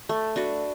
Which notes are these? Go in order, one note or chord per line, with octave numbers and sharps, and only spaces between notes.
A3
D4 F#4 B4